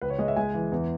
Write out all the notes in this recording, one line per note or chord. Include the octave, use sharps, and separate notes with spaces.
C#2 B4
C#5
G#3 D#5
E5
G#3 G#5
E3
E2